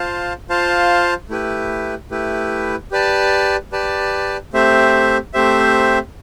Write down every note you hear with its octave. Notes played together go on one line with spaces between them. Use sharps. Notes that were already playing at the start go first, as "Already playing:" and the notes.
Already playing: F4 C5 F5 A5
F4 C5 F5 A5
A3 E4 G4 B4
A3 E4 G4 B4
G4 B4 D5 A5
G4 B4 D5 A5
A3 C4 G4 C5 E5
A3 C4 G4 C5 E5